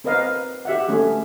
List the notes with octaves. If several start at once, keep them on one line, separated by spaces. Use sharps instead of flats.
C4 A#4 B4 D#5 F5
G4 E5 F#5
A3 C#4 G#4